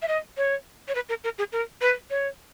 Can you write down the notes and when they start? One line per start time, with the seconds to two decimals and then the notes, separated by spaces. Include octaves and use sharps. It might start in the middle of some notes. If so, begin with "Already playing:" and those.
0.02 E5
0.08 D#5
0.37 C#5
0.88 C#5
0.95 B4
1.09 A#4
1.24 A#4
1.38 G#4
1.52 A#4
1.81 B4
2.10 C#5